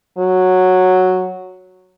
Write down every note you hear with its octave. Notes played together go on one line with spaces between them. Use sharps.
F#3